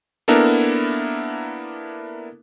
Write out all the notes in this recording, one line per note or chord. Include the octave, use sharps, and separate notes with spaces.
A#3 B3 D4 E4 A4 A#4